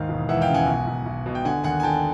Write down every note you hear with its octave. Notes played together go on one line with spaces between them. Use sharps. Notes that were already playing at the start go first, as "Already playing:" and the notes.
Already playing: D#2 G#2 F5
E1
E3 E5 F#5
F5 G5
C#3
F#5 G#5
B1
B1
B1
B2
G5
D3 F#5 G#5
D#2 F#5 G#5
G#5
D3 G5 A5